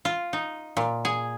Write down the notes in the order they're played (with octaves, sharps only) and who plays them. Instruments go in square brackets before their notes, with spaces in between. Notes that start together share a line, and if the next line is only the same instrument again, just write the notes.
[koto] F4
D#4
A#2
G#4